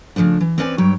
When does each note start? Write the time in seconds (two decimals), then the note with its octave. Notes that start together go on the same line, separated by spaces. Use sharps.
0.16 C#3 E3 F3 A3 D4
0.41 E3
0.58 C4 C#4 B4 D5 G5 G#5
0.78 G2 F#3 C#5 G5